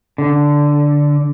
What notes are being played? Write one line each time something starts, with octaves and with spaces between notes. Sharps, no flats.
D3